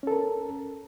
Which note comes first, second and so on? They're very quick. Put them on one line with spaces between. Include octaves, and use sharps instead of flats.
C#4 A4 A#4